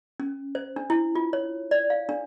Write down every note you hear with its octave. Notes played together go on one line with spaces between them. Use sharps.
C#4
C5
D4
E4
F4
C#5
D5
F5
D4